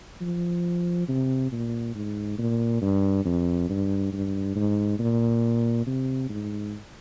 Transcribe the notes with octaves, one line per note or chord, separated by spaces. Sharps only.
F3
C3
A#2
G#2
A#2
G2
F2
G2
G2
G#2
A#2
C3
G#2